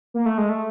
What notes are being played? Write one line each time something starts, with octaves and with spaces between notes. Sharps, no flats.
A#3
A3
G#3
A3